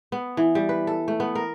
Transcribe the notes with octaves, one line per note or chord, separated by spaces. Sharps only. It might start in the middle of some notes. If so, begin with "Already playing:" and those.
B3
E3
G3
B4
A4
A3
B3
A#4